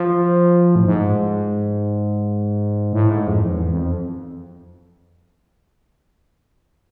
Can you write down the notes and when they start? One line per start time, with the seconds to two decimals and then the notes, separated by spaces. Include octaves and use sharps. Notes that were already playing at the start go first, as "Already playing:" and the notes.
Already playing: F3
0.76 A2
0.86 G#2
2.93 A2
3.10 G#2
3.27 F2
3.44 E2
3.70 F2